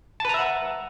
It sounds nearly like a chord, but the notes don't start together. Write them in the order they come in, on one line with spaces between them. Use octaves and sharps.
A5 B4 A#5 E5 F#5